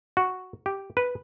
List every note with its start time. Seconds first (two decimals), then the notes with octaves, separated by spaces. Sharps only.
0.17 F#4
0.66 G4
0.97 B4